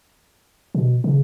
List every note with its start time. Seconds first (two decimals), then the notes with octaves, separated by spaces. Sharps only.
0.75 B2
1.04 C#3